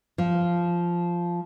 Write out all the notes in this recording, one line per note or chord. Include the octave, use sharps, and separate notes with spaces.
F3